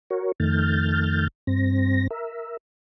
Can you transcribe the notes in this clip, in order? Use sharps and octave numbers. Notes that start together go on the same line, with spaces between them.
F#4 A#4 C#5
F2 D#3 A3 F6 G6 A6
G2 C4 A#6
A#4 E5